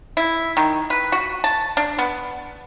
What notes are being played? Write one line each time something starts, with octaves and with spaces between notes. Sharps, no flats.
E4
D#3
B4
F#4
A5
D4
B3